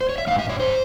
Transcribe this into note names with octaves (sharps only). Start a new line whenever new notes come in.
C5
C#5
E5
G2 E3 F5
E5
C#5
C5